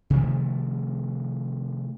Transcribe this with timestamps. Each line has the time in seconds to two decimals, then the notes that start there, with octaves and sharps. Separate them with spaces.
0.10 C3 D#3 F3 A3